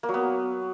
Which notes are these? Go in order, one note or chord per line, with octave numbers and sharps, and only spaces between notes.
A#3
F#3
B3